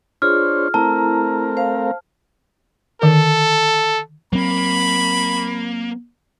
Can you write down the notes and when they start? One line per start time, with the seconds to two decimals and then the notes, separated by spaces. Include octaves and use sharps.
0.22 D4 F4 G#4 C5 C#5 F6
0.74 A3 C4 E4 A#4 A5 A#5
1.57 C5 F5
3.02 D3 D#3 A4 A#4
4.33 F#3 A#3 C4 B5